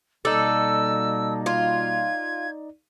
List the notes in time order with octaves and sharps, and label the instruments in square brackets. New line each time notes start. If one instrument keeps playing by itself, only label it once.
[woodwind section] B2 G3 A#3 [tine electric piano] D#4 D5 [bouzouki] A4 [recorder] E6
[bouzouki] F4 [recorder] G#6